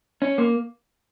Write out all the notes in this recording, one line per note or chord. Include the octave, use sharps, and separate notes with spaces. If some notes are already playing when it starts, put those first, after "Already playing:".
C#4
A#3